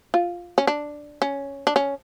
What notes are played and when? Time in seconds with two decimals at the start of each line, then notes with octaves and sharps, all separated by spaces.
0.14 F4
0.58 C#4
0.67 D4
1.22 C#4
1.67 D4
1.76 C#4